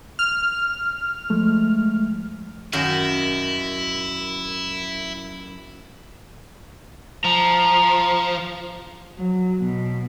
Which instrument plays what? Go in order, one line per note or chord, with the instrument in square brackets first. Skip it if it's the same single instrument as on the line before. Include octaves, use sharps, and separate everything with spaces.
[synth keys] F6
[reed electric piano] F3 G#3 A3
[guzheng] F#2 D#3 F#4 [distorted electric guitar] E4
[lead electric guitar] F3 [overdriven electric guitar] A#5
[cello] F#3
B2